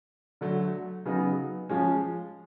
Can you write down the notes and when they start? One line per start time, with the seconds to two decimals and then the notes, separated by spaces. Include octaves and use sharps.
0.41 D3 F#3 A3
1.05 C#3 F#3 B3 D#4
1.69 F3 G#3 C#4